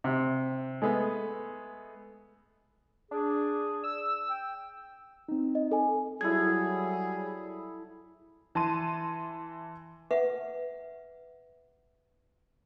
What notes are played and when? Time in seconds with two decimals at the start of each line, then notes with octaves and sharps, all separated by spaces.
0.04 C3
0.82 G#3 A3 B3
3.11 D4 G#4
3.84 E6
4.30 G5
5.28 C4 D#4
5.55 D#5
5.72 A4 G#5
6.21 F#3 G3 E4 G#4 A4 D#6 G#6
8.55 E3 A5 C6 D#7
10.11 B4 E5 F#5